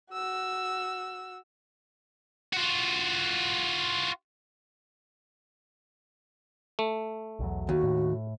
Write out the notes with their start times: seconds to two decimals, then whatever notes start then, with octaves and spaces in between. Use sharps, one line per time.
0.12 F#4 E6
2.53 F4 F#4
6.79 A3
7.39 B1 E2 F#3
7.69 D#2 F#4
7.83 A2